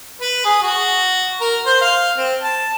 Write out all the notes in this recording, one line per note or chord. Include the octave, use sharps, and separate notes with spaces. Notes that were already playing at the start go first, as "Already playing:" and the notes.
B4
G#4
F#4
A#4
C5
F5
C4
A5